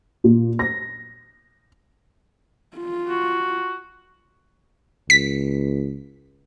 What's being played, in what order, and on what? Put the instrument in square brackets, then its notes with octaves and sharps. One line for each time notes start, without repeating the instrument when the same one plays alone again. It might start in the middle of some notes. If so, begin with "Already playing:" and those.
[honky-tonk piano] A#2
A#6
[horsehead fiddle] F4
[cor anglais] F#4
[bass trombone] C#2 [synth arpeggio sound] B6